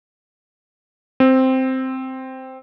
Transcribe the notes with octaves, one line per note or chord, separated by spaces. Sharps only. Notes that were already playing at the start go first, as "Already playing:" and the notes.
C4